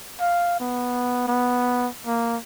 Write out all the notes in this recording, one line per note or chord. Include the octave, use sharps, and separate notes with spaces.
F5
B3
B3
A#3